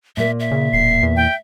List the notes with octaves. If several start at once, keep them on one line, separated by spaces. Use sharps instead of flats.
A#2 A#3 E5
E5
C#3
D1 C7
E2
G5